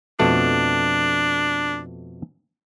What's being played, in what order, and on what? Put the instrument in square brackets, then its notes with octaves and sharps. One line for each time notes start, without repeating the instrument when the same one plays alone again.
[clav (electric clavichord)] F2 B2 A3 [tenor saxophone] D4